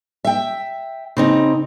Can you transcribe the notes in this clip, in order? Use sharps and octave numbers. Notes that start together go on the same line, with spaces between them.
E5 G5
C#3 C4 D#4